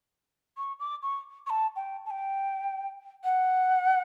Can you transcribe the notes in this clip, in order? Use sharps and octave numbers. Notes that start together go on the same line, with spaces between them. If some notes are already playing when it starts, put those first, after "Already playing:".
C#6
D6
C#6
C#6
A5
G5
A5
G5
F#5